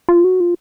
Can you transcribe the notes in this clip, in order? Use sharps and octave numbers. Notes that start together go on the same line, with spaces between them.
F4
F#4
F4